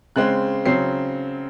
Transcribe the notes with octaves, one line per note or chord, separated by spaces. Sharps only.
C#3 G#3 C4 F#6
C#3 F#3 C4 C7